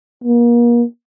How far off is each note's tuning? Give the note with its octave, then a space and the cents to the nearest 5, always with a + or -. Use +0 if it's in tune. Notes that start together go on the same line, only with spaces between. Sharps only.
A#3 +35